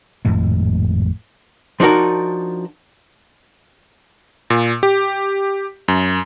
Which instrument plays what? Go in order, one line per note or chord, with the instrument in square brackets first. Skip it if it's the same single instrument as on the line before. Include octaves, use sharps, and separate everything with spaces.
[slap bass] G#1 F2 A2 G#3
[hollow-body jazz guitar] F3 D4 D#4 F#4 A#4
[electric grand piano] A#2
G4
F#2